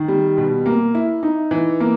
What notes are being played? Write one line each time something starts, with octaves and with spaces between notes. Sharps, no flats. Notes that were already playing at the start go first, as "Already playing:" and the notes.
Already playing: D#3
G3
B2
A#3
E4
D#4
E3
A#3